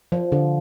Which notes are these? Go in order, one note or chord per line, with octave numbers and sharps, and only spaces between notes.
F3
D3